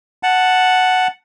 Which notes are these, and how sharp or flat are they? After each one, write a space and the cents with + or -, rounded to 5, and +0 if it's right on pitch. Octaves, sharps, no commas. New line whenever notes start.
F#5 +0 A5 +0